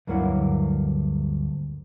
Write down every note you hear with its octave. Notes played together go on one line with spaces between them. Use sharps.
D2 G2 F#3 A#3 E4 F#5